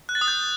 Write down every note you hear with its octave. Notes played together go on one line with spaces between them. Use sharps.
F#6
A6
D#6
G6